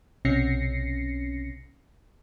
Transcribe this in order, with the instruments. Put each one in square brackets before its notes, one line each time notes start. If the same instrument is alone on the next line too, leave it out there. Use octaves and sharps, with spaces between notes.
[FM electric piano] B1 C3 C#4 A#6 C7 C#7